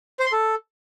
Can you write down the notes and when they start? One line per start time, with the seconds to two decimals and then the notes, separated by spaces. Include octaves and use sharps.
0.19 C5
0.26 C6
0.32 A4